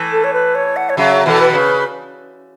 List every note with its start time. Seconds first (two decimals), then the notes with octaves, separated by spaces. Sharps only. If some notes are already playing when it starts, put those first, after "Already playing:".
Already playing: E3 A3
0.12 A4
0.24 C#5
0.33 B4
0.55 C#5
0.76 F#5
0.89 C#5
0.97 C#3 F#3 E5
1.26 B2 E3 A4
1.40 B4
1.49 E3
1.53 C#3